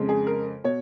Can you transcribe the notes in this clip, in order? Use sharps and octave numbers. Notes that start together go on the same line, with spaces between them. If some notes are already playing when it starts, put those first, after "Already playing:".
Already playing: F2 C#3 G#3
G#4
A#4
B2 C#5